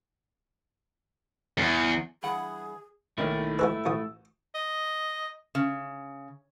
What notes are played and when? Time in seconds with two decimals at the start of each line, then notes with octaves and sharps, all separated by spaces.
1.58 E2
2.23 G2 E3 G#4 F#5
3.18 B1 D#3 A3 A#3 E4
3.59 F3 G#3 B4 E6
3.85 A1 F3 D#6
4.55 D#5
5.55 C#3